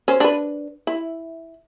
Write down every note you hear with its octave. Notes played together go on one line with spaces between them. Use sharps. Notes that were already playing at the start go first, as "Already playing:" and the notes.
C#4 C5
D4 B4
E4